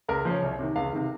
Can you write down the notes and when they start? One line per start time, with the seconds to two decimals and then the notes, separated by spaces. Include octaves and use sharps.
0.08 C#2 A#4
0.25 F3 C5
0.30 C#3 C#5
0.42 C2
0.59 C3 D#3
0.76 C#2 F5
0.93 C3 D#3